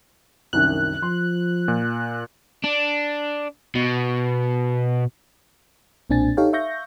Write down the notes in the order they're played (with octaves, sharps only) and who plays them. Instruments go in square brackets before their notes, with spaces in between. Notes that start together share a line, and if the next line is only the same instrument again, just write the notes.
[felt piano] C2 F#2 D#3 [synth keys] F#6
[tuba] F3 [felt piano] C6
[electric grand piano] A#2
[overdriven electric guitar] D4
B2
[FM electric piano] B1 A#2 C4 D4 G#5 A6
D#4 G4 A4 C#5 F5 G5
E5 F5 C#6 G6 A#6